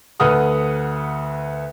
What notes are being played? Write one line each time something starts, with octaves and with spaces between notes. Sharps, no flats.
D2 A4 B4 F#5 D#6 F6